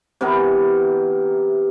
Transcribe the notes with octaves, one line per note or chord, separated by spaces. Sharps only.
C3 E3 B3 A#4